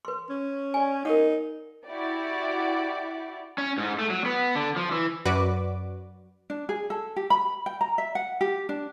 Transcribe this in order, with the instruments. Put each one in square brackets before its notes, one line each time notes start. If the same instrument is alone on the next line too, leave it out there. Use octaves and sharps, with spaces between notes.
[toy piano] B4 C6
[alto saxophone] C#4
[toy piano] D5 G#5
[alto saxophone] D#4 [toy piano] A#4 F#5
[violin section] E4 F#4 G4 D5
[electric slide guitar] C#4
G#2
A3
F#3
B3
D3
F3
E3
[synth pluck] F#2 F#4 B4 D5 D6
[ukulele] D4
G#4
A4
G4
B5
G5
A#5
E5
F#5
G4
D4